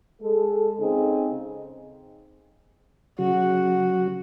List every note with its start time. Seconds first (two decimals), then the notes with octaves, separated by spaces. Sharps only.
0.22 G#3 A4
0.80 C#3 C4 D#4 G#4
3.19 C#3 F#3 F#4